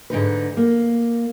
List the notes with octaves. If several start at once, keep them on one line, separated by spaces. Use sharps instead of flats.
G#2 D3 D#4 B4
A#3